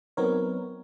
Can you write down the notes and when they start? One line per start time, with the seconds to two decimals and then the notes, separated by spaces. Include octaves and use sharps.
0.17 F#3 B3 C4 D#4 A#4 C#5